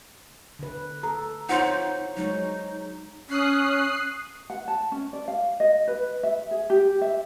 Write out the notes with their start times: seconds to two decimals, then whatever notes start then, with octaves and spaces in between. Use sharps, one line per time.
0.59 D3 B4
1.03 A4 A#5
1.49 D#4 F4 C5 C#5 F#5 C6
2.17 F#3 G#3 D#4 C#5
3.29 C#4 D#6 F#6 C7
4.50 F#5
4.68 A5
4.92 C#4
5.13 D5
5.28 F5
5.60 D#5
5.88 B4
6.23 E5
6.51 G#4
6.70 G4
7.01 E5